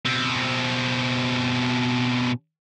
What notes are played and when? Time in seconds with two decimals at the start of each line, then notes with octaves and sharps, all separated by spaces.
0.05 B2 C4